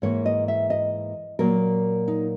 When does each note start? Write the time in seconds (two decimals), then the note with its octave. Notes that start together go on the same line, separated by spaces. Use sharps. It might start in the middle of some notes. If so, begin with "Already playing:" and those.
0.02 G#2 E3 A#3 C#5
0.26 D#5
0.48 E5
0.70 D#5
1.39 A#2 F#3 A#3 A#4
2.08 D#4